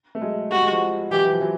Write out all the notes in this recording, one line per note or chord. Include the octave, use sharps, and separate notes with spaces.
A3
F#3 G#3
G3 F#4
G#3
F3 G3
E3 F#3 G4
E3
F3
E3 F#3